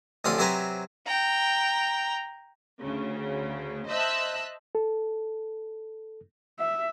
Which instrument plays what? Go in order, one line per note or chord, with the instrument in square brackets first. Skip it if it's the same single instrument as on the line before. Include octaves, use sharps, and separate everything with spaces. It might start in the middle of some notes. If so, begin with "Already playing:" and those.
[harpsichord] A1 F2 D3 F4 D5 D#6
C3 F#3 C4 B4 G#5 A#5
[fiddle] G5 A#5
[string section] D2 C#3
C5 D#5 E5 A5 E6 F#6
[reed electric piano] A4
[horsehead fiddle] E5